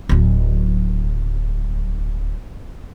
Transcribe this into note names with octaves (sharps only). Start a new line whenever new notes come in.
D1 F#3